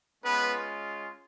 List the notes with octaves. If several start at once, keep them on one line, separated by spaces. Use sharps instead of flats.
G#3 B3 C#4 F4 B4